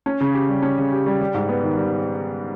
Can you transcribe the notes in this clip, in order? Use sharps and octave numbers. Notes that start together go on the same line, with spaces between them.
C#4
C#3
G4
G3
C#4
C#3
G4
G3
G3
G#2
B3
D#3
G3